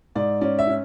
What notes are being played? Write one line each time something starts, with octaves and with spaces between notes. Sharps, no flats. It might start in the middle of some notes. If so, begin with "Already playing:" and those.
G#2 D5
C#4 D5
E5
C#4